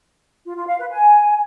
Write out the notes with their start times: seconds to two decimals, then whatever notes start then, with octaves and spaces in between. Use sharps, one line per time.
0.45 F4
0.56 F4
0.67 F5
0.79 B4
0.90 G#5